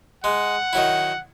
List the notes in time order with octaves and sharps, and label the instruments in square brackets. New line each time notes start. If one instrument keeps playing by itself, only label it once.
[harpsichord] G#3 [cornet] F#5
[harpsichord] D#3 F#3 E4